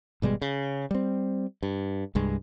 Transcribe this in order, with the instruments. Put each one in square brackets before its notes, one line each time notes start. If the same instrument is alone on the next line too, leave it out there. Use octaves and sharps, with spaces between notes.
[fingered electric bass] G#1 B2 G3 G#3
C#3
G3 C4
G2
C2 G2 G#3